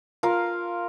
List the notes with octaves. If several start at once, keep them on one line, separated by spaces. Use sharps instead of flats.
F4 A#4 F5